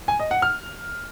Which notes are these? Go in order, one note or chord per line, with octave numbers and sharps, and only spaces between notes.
G#5
D#5
F#5
F6